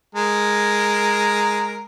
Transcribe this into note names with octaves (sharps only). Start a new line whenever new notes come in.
G#3 A#4 A#5